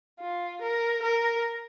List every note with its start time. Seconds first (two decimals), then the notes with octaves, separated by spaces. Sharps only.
0.21 F4
0.61 A#4
1.02 A#4